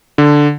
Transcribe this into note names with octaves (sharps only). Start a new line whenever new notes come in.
D3